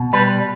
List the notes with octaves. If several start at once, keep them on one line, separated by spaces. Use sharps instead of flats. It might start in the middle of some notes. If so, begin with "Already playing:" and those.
Already playing: B2
G3 B4